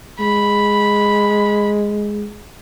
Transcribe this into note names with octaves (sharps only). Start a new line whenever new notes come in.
G#3 B5